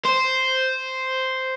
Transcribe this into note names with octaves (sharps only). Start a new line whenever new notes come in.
C5